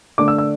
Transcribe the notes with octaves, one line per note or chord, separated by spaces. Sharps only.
D3 A3 D4 D6
E6
E6